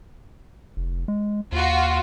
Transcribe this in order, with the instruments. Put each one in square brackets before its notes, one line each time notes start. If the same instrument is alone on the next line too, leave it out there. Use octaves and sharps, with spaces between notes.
[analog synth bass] F1
G#3
[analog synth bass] D#2 [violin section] F4 F#4